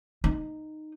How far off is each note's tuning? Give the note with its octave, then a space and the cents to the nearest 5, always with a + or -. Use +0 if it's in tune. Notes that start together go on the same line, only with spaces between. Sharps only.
D#4 -10